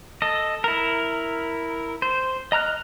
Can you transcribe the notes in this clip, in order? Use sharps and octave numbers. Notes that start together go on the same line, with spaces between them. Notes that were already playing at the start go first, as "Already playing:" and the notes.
A4 D#5
E4 A#4
C5
D#5 A#5 F6 F#6